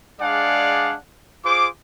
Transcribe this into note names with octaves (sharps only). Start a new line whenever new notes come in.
G#3 D4 G#4 D5 F5 F#5
F4 G#4 C5 D6